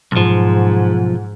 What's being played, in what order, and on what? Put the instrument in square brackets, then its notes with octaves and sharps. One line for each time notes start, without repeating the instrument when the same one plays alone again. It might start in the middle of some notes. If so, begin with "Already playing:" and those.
[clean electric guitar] B1 F3 [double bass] G#2